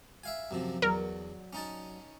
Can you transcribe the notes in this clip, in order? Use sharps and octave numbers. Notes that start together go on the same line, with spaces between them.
E5 F5 G#5
F#2 C3 F3
E2 F#3 A#4 D5
C#4 D#4 A5